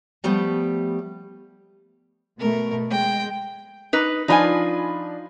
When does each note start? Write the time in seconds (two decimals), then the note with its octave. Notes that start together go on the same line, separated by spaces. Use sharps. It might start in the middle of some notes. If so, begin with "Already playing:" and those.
0.24 F3 G3 A3 B3 G4
2.40 B2 A3 A#4
2.90 G#3 G5
3.93 D#4 B4
4.28 F3 D4 D#4 F4 G#5 B5